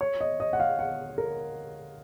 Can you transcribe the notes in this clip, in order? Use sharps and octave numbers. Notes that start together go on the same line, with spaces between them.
C#5
D#5
D#5
F#5
F5
F#5
A#4